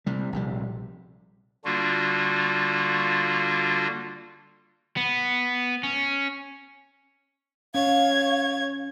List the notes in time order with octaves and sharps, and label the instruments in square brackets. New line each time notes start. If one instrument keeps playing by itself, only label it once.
[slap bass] C3 G3
A#1 C3 G3
[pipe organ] D3 G3 A#3 D4 F4 F#4
[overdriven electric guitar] B3
C#4
[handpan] C#4 [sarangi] C#5 [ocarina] F5 [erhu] G#6